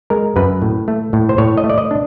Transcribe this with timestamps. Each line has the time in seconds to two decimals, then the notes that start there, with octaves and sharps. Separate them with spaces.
0.10 G#3 A#4
0.36 F#2 B4
0.62 A2
0.88 A3
1.13 A2
1.29 C5
1.38 A2 C#5
1.57 D#5
1.64 A3
1.70 D5
1.78 D#5
1.91 D4